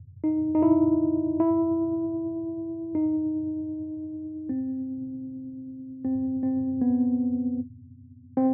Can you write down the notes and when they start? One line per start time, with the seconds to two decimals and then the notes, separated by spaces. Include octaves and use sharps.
0.24 D#4
0.55 D#4
0.63 E4
1.40 E4
2.95 D#4
4.49 C4
6.05 C4
6.43 C4
6.82 B3
8.37 C4